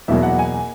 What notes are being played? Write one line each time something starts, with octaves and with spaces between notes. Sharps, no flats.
E2 B2 F#3 A#3 E5
F#5
G#5